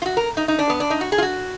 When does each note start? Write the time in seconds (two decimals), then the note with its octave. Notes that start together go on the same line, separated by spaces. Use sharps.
0.02 F4
0.06 F#4
0.17 A#4
0.37 D#4
0.48 D#4
0.59 D4
0.70 B3
0.80 D4
0.90 D#4
1.01 F#4
1.12 G#4
1.18 F4
1.22 F#4